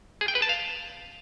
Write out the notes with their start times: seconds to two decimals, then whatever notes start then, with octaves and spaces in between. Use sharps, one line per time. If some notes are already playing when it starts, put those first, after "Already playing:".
0.21 G#4
0.28 G5
0.35 B4
0.42 A5
0.49 F5